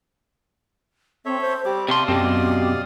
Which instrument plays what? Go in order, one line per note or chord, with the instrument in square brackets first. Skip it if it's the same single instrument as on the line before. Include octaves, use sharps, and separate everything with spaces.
[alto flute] C4 [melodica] A4 C#5 E5
[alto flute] C5
[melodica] G3 C4 D6 [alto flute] G4
[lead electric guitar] C3 C6 [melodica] D5 F5 D#6 [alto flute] A5
[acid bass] F#2 [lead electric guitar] B2 C4 [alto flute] G4